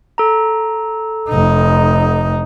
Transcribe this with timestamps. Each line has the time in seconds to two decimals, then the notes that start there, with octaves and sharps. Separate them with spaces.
0.18 A4 A#5
1.29 F1 D#4